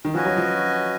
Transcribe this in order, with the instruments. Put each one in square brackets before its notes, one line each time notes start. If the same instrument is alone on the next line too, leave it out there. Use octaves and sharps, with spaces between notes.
[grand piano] D#3
[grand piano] F3 [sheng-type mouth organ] C#4 F#4 B4 D#5 G#5
[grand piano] F#3
F3